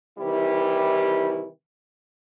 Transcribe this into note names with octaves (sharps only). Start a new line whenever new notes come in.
C3 D#3 E3 G3 E4 G4